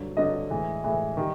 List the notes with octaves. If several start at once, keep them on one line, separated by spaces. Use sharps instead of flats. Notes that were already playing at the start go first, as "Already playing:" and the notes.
Already playing: G2 D3 F#3
G2 D3 F#3 D#5
A2 E3 G#3
A2 E3 G#3
D#3 G3